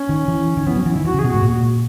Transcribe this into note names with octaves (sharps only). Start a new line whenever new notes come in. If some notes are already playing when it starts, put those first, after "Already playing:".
Already playing: C#4
D#3
E3
D#3
E3 B3
F#3 C#4
E3
D#3 E4
E3 F#4
C#3 G#4
B2
G#2 F#4
A#2